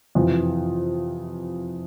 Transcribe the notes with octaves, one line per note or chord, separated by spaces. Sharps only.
F2 C3 E3